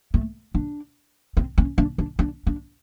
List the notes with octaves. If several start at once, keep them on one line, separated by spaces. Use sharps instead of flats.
A3
D4
C4
C#4
D4
D4
D4
D4